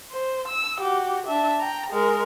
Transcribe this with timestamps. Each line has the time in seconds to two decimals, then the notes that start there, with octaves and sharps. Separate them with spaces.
0.11 C5
0.48 E6
0.79 F#4 G4
1.27 D4 E5
1.60 G5 A#5
1.91 G#3 A#4